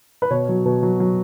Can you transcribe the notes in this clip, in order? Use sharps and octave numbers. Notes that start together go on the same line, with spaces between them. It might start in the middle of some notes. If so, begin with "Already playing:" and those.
B4
B2 C#5
F#3
B2
F#3
F#3